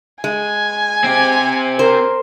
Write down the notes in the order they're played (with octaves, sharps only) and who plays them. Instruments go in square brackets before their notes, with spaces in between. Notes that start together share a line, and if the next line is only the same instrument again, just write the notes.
[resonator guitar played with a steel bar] G#3 [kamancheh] G#5
[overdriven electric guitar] C4 G4
[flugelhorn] A#4 [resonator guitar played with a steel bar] C5